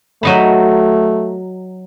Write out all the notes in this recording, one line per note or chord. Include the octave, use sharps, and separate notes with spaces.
F#3 A3 D#4 B5